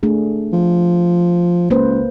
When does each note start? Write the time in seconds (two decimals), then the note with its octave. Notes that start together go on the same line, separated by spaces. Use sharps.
0.03 A3 D4 G#4
0.53 F3
1.70 C#2 A#3 B4 C5